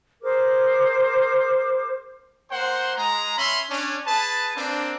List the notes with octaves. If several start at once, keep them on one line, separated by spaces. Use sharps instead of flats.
G#4 A#4 C5 D6
A#3 C5 F#5 C6
G#3 A#5
C#4 E5 B5 C6
C#4 D4
G#4 B4 A5
A#3 C4 D4